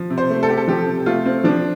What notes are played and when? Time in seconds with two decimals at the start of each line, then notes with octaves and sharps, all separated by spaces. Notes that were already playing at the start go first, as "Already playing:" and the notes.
Already playing: F3
0.10 C3
0.18 C5
0.30 A3
0.43 A4
0.48 C4 G4
0.57 A4
0.68 F3 G4
0.87 C3
1.06 A3 F4
1.26 C4
1.44 F3 D4